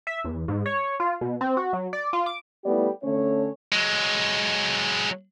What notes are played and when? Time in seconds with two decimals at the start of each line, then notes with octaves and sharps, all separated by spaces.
0.07 E5
0.24 E2
0.48 G#2
0.66 C#5
1.00 F4
1.21 B2
1.41 C4
1.57 F#4
1.73 F#3
1.93 D5
2.13 F4
2.26 D6
2.65 G3 A3 B3 E4 G4 D5
3.03 D3 A3 C#4 C#5
3.72 F#3 G#3